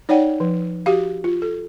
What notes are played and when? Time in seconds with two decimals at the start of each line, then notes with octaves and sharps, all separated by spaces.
0.09 D#4 C#5 D5 F#5 G5
0.40 F3
0.86 F#4 G4 F5
1.24 F4
1.42 A4